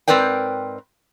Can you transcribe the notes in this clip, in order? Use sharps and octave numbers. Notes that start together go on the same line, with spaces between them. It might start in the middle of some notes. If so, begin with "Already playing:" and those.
G#2 C4 A#4 B4 D5 G5